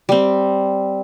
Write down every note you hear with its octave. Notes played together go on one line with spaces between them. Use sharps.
G3 C4